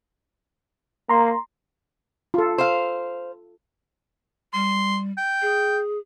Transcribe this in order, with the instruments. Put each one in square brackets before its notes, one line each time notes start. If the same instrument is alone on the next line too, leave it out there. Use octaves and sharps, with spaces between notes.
[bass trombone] A#3 [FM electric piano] A#5 C6
[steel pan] F4 A4
[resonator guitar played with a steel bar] C5 F5
[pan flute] G3 [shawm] C6
[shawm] G5
[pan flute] G#4